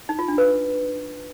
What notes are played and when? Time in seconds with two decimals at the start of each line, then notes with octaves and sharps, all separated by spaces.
0.09 D#4
0.19 F4
0.28 D4
0.38 B4